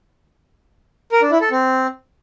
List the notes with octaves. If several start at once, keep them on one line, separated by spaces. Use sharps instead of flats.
A#4
D4
E4
A4
C4